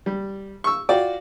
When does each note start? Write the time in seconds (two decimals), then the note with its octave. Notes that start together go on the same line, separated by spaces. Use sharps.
0.06 G3
0.64 C#6 E6
0.89 F4 F#4 D5 G5